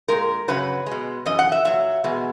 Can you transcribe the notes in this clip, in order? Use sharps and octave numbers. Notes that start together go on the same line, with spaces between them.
A#2 G#3 A#4
F#2 C#3 F#3 B4
B2 G#3
F#2 E3 D#5
F#5
E5
A#2 F#3 E5
E2 B2 G#3